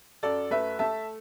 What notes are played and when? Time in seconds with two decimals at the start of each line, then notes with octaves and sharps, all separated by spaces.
0.23 F#2 A4 D5
0.51 A3 B4 E5
0.79 A3 E5 A5